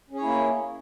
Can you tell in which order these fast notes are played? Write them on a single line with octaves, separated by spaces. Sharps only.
C#4 G#4 C#5 E4 A#3